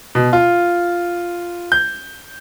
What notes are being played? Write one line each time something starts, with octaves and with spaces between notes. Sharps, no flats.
B2
F4
G6